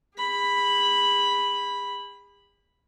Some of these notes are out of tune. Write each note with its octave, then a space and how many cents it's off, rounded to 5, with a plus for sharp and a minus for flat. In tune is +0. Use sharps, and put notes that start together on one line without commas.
G#4 -40 B5 +0